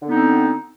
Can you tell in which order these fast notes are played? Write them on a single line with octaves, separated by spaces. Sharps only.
D3 B3 D#4 C4